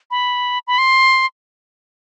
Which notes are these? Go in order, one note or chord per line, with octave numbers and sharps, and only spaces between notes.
B5
B5
C6